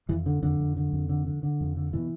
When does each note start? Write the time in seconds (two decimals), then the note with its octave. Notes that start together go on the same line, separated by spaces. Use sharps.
0.09 F2 E3
0.26 D3
0.43 F2 D3
0.60 F2
0.77 D3
0.93 F2
1.09 D3
1.27 D3
1.43 D3
1.61 F2
1.77 D3
1.93 B2 E3